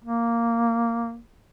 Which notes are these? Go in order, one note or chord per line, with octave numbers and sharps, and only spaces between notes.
A#3